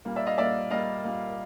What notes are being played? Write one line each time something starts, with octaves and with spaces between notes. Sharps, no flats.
A#2 G3 A#3
D5 E5
D#5 F5
A#2 G3 A#3 D5 E5
A#2 G3 A#3 D#5 F5
A#2 G3 A#3